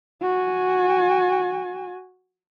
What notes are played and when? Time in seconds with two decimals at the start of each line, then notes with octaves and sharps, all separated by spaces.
0.22 F#4 G#5